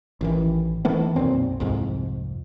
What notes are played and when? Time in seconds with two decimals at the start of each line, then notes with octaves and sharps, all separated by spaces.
0.21 A1 D#3 E3
0.85 D#3 E3 A3 B3
1.16 B1 F#2 A#2 C4
1.60 C2 F2 G#2